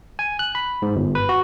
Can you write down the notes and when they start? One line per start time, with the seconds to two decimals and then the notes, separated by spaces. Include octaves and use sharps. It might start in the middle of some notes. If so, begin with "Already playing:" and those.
0.19 G#5
0.39 F#6
0.55 B5
0.82 G#2
0.96 G1
1.15 B4
1.29 F#4